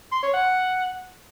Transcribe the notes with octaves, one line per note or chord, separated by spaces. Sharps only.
C6
C#5
F#5